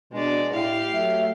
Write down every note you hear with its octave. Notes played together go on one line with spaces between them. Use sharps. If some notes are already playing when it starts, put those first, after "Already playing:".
B2 G#3 D4 D5
A2 E4 G4 F5
F#3 A3 E5